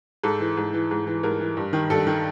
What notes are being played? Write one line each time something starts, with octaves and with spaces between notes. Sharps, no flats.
G#2 A4
E3
G#2
E3
G#2
E3
G#2 A#4
E3
G2
D#3
G2 A4
D#3